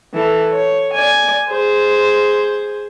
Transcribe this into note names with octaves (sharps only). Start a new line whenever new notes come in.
E3 A4
C#5
D5 G#5
G#4 C5